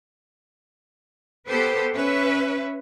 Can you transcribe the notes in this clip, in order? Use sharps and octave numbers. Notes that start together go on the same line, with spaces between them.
B3 G4 A4 B4 C5
C#4 B4 E5